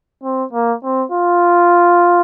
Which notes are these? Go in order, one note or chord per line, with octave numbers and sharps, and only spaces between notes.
C4
A#3
C4
F4